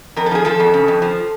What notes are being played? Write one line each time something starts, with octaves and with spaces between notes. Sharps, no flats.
F2 A#4
A4
F3 G#4
F3 A4
F2
C#3
F2
F3